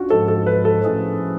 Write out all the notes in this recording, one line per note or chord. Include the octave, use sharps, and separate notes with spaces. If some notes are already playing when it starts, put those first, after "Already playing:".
Already playing: C#4 D4 F4 F#4
G#2 F3 G#3 A4
A4
B4
A4
A2 F3 A3 C#4 G#4